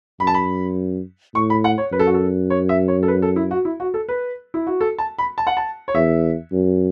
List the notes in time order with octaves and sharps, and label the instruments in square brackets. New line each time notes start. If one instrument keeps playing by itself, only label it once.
[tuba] F#2 [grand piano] B5
[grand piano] A5
B5
[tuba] A2 [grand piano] C#6
[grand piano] B5
F#5
C#5
[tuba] F#2 [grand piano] B4
[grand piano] A4
F#4
A4
C#5
E5
C#5
A4
B4
A4
E4
F#4
E4
F#4
A4
B4
E4
F#4
A4
A5
B5
A5
F#5
A5
C#5
[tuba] E2 [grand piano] E5
[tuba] F#2